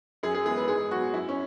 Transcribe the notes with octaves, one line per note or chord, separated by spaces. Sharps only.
F#2 G#4
G#4
E3 G#3 B3 G#4
B4
G#2 G#4
F#3 B3 F#4
F#2 E4
C#4